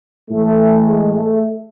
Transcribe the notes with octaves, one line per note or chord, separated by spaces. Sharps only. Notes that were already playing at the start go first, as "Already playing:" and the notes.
A2 E3 A3
G#3
A3